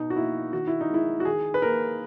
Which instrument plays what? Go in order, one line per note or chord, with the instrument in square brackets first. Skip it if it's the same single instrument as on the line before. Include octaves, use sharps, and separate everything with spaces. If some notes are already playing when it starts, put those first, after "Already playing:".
Already playing: [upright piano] B2 D#4
F#4
A#3 E4
D#3 F#4
E4
D#4
G#3 E4
F#4
D#3 G#4
B4
A#3 A#4